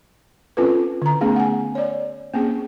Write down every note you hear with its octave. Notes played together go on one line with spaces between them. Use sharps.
C4 C#4 F4 A4 B4
D3 A#5
A3 B3 C#4 D#4 G#4
F#5 G#5
C#5 D5
A#3 C4 C#4 G#4